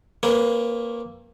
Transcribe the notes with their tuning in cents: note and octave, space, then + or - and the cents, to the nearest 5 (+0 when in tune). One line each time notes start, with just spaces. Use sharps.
A#3 +0 C#4 -45 B4 +0